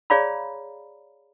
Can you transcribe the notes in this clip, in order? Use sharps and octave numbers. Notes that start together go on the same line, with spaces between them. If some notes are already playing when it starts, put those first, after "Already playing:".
G#4 C#5 D5 F5 A#5 B5